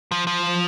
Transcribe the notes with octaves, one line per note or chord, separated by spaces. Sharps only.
F3
F3